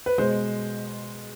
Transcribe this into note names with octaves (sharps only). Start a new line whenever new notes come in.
B4
B2 G#3 C5